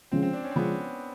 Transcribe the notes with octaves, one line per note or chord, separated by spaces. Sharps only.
C#3 F3 G#3 C4 C#4 F4
C4
D4
C#4
C4
C#3 F3 G#3 B3 C#4 F4